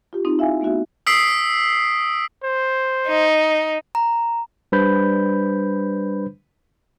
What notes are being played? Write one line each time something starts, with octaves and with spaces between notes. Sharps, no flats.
F4 G4
C4 D#4 F4
E4 E5 F5 G#5
A3 B3 D#4 F#4 E5
D#6 E6 B6 C7 D7
C5
D#4
A#5
G3 D4 B4 C5 B5 G6